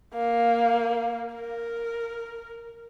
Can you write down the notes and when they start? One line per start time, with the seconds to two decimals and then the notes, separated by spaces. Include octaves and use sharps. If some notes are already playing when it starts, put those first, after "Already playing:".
0.14 A#3
1.34 A#4